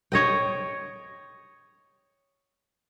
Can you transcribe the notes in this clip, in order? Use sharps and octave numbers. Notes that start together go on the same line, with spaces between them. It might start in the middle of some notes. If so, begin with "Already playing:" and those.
C#5 D#5 G5